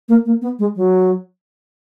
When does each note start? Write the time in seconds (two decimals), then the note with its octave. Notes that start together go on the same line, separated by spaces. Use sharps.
0.09 A#3
0.26 A#3
0.42 B3
0.59 G#3
0.76 F#3